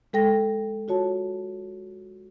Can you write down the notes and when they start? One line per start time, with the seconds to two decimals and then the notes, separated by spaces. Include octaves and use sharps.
0.13 G#3 A4 G5 A#6
0.88 F4 F#4 C#5 A5